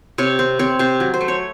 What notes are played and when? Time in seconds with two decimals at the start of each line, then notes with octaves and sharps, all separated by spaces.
0.18 C3 C#5
0.39 C4
0.59 C4 C#5
0.79 C3 C5
1.00 F#3
1.14 C5
1.21 A3
1.28 C#5